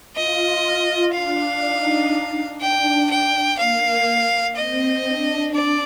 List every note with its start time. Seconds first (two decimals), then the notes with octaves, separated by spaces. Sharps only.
0.16 F4 D#5
1.14 D4 F5
1.63 D#4
2.61 D4 G5
3.10 G5
3.58 A#3 F5
4.56 C4 D#5
5.06 D4
5.54 D4 D5